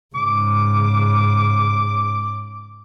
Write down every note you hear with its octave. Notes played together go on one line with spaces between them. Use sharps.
G#2 C#3 D6